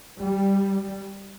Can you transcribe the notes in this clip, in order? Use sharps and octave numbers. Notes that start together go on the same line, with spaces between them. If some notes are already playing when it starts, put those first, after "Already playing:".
G3